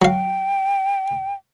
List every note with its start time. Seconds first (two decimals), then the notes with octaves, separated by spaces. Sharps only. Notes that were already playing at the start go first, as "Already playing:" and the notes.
0.02 F#3 F5 G5